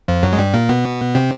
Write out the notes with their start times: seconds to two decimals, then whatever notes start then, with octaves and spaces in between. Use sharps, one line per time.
0.08 F2 F3
0.23 F#2 F#3
0.33 G#3
0.38 G2 G3
0.54 A#2 A#3
0.69 B2 B3
1.15 C3 C4